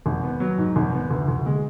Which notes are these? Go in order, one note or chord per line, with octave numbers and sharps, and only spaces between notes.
G#1
B3
F#3
G#2
G#1
B3
D2
D2
G#3